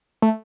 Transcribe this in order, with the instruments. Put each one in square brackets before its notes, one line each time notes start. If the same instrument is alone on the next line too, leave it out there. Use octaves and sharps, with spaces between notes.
[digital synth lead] A3